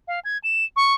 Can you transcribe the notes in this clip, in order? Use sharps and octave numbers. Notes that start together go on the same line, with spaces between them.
F5
G#6
E7
C#6